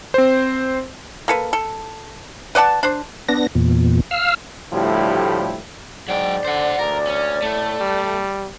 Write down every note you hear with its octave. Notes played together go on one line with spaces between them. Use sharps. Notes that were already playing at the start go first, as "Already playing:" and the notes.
C4 C5
A#3 A4 B4
A4
B4 D5 F#5 A5
D4 C5
B3 D4 A#6
E2 A#2
F5 E6 F6
D2 A2 F3 G3 E4 G4
G#2 F#3 D5 G5
D3 C5 F#5
D2 A#4
C#4
A2 A3
G3